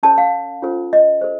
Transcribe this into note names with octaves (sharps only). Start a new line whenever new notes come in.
C#4 A4 C#5 A5
F5
C#4 F4 A4 C5
D#5
A4 C5